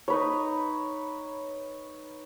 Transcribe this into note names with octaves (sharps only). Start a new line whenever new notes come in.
D#4 B4 C#5